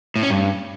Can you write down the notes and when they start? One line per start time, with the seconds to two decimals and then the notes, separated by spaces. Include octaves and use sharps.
0.16 A2
0.23 C#4
0.30 G2